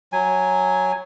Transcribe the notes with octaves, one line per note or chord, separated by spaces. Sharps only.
F#3 G#5